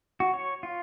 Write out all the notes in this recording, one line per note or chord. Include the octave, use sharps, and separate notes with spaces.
F#4
C#5
F4